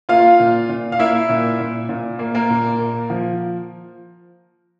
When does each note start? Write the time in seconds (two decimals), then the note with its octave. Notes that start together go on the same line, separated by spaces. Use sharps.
0.09 A#3 F4 F5
0.40 A#2
0.69 A#2
0.92 F5
0.99 A#3 E4 E5
1.29 A#2
1.60 A#2
1.89 A#2
2.19 A#3
2.35 A#3 A#4
2.50 A#2
2.79 A#3
3.10 F3